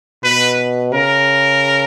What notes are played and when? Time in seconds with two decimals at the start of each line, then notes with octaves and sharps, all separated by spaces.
0.23 B2 B4
0.93 C#3 A#4